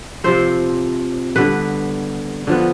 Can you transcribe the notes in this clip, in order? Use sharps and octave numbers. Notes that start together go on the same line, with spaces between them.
C3 F3 C4 C5
D3 G3 B3 B4
D3 F3 B3